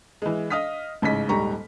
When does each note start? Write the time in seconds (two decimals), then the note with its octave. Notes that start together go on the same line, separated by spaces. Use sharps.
0.22 E3 G#3
0.50 D#5 F5 D#6 F6 B6
1.02 A1 G#2 C#3 D#5 B6
1.29 D#1 G#2 G3 A#5 C#6